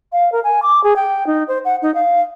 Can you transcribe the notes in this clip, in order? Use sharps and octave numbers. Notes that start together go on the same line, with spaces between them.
F5
A#4
G#5
D6
G#4
G5
D#4
C5
F#5
D#4
F5